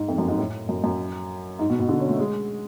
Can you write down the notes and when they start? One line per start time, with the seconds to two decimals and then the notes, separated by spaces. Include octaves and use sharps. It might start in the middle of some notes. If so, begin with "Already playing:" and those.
Already playing: G#2
0.08 F2
0.18 F#2
0.28 G#2
0.38 A2
0.69 F#2
0.84 F#2
1.59 G#2
1.70 B2
1.80 B2
1.89 D3
2.00 C#4
2.09 A3
2.19 G#3